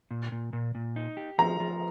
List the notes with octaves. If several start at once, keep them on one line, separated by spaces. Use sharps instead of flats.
A#2
A#2
A#2
A#2
D#4
G4
F3 A#5
F3